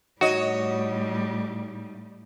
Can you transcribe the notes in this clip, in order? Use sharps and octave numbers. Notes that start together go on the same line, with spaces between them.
A2 G3 D#4 F#4 C#5 D#5